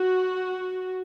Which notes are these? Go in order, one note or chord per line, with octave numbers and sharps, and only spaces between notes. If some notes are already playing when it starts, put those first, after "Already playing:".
Already playing: F#4